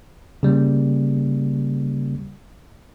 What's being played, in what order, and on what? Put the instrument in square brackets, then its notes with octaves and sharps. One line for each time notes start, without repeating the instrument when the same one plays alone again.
[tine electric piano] C#3 G3 A#3